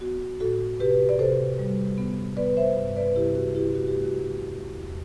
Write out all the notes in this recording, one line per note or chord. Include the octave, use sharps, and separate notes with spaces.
B3 F#4
A2 F#4 A4
C3 G4 B4
D5
C3 A4 C5
G3
B3
B3 B4 D5
C5 E5
G2
B4 D5
C3 E4 G4
F#4
C3 E4 G4
F#4
G4
A3
F#4
G2
E2